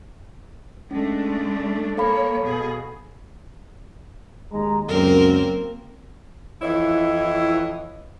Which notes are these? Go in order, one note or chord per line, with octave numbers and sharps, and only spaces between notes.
G#3 A3 C#4 D4
A#3 A4 C#5 F5 B5
B2 G#4
D#2 G#3 A#5
C#2 F#2 A#3 C4 A#4
F2 E3 E4 C#5 D#5